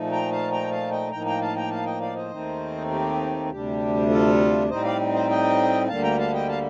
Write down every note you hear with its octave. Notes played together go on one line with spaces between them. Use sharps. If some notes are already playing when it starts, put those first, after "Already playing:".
Already playing: A#2 F3 A3 D#4
G5 A#5
F5 A5
G5 A#5
F5 A5
D#5 G5
A2 F3 A#3 D#4 G5 A#5
G5 A#5
F5 A5
G5 A#5
F5 A5
D#5 G5
D5 F5
C5 D#5
D#2 D#3 A3 C4 D#4
G4
D2 C3 G3 D4 G4
F4 A4
A2 G3 C4 D#4 C5 D#5
D5 F5
C5 D#5
D#5 G5
D2 D3 G3 A#3 F5 A5
G5 A#5
F5 A5
D#5 G5
F5 A5